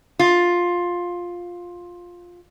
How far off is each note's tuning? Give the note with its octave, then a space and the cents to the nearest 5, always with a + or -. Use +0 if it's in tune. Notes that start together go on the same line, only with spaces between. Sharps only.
F4 +10